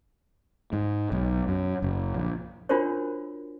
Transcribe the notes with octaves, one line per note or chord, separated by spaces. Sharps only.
G#2
B1
F#2
F#1
A#1
D4 F4 F#4 A#4 C5 C#5